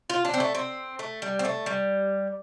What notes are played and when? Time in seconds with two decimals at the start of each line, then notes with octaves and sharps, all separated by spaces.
0.10 F4
0.25 D4
0.34 C4
0.40 A3
0.55 C4
0.99 A3
1.22 G3
1.39 C4
1.45 A3
1.66 G3